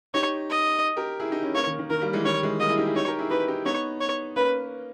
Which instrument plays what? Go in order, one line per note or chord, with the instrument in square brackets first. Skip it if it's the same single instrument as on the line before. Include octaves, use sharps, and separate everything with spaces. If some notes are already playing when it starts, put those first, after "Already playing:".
[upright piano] D#4 G4 [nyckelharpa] C#5
[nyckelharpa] D#5
[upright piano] G4 A#4
E4 G#4
D#4 G4
C#4 E4
[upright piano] A#3 C#4 [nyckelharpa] C#5
[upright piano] D#3
D#3
[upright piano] D#3 [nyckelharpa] A#4
[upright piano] G3 A#3
E3 G#3
[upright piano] D#3 G3 [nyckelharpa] C#5
[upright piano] E3 G#3
[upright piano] G3 A#3 [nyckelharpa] D#5
[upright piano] E4 G#4
D#4 G4
E4 G#4
[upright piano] D#4 G4 [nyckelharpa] C#5
[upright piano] G4 A#4
E4 G#4
[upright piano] D#4 G4 [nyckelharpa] B4
[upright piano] D#4 G4
[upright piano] B3 D#4 [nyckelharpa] C#5
[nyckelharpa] C#5
[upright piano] A#3 C#4 [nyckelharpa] B4